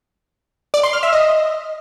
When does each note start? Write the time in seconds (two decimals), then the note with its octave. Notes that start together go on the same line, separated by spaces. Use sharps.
0.74 D5
0.83 C6
0.93 F6
1.03 E5
1.13 D#5